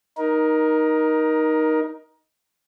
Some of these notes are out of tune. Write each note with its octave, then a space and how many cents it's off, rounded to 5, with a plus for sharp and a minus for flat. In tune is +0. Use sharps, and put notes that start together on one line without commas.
D#4 +0 A#4 +20